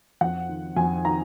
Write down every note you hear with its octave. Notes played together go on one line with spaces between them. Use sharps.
F2 F#5
D#3
F2 G#5
D#3 A#5